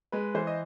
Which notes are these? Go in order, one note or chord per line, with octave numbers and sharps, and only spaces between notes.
G#3 B4
E3 C5
D#5